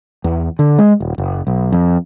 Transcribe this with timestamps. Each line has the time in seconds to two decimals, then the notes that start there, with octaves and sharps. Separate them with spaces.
0.24 E2
0.59 D3
0.78 G#3
1.00 D#1
1.18 F#1
1.47 B1
1.72 F2